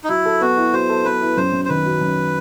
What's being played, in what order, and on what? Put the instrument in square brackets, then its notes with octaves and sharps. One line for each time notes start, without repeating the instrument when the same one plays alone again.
[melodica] D#4
[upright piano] F#3 [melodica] E4
[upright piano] A4
[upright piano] B3 [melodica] F#4
[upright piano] E4
[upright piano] F#3 [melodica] C5
[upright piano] A4
[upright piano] B3 [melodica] B4
[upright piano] E4
[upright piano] F#2 [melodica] C5
[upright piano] F#2
[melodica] C5
[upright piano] D#3 [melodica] B4
[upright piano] F#3
F#2